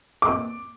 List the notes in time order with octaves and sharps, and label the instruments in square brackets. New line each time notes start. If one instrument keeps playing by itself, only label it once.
[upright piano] D6